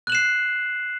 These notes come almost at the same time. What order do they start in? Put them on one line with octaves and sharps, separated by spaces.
F#6 F#7 E7 C7